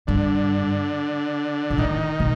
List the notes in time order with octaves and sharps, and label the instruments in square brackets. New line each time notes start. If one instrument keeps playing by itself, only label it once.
[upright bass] G2 [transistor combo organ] D3
[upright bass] A#2
[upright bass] A2 [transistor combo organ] D#3
[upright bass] B2